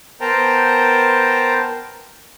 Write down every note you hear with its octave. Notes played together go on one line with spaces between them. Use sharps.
B3 A#4 C5 G5 A5 A#5